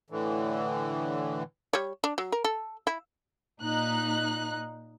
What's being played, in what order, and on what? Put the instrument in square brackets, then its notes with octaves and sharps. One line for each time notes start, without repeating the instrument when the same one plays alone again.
[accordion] A2 D3 E3
[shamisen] G3 C#5
D4
F#3
A#4
A4
E4
[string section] A#2 D#4 F#6